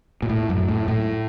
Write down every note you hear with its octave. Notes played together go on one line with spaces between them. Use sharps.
A#2
A2
F#2
A2
A2